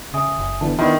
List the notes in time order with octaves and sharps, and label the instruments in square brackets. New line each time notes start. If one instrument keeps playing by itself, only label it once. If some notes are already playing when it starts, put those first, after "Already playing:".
[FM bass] C#3 [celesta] E5 G#5 D#6
[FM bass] F#1
[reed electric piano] D3 E3 B3 [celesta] A5
[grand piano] D#3 [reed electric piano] B3 D4 E4 [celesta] C6